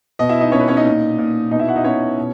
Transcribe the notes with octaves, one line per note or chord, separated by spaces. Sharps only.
B2 D#5
E4 E5
D#4 D#5
B2 C#4 C#5
B4
C#4 C#5
D#4 D#5
A#2
A#2
B2 D#4 D#5
E4 E5
F#4 F#5
D#4 D#5
B2 C#4 C#5
B2